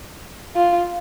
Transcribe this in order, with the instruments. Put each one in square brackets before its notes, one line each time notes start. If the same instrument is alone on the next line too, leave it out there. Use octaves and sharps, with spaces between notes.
[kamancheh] F4